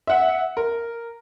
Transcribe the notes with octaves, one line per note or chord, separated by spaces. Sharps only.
E5 F#5
A#4